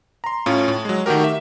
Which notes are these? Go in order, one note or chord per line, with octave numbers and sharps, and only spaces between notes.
A#5 C6
A2 C#4 F4
A2
F#3 G#3
D#3 A3 F#4 G4 A#4
E5